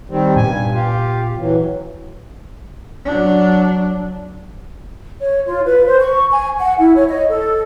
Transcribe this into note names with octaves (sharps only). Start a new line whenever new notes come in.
D#3 G3 C4
G2 A#2 B3 G#5
F4 G4
E3 F#3
F#3 D4
C#5
F4
B4
C5
C#6
G#5
F#5
E4
C#5
D#5
A4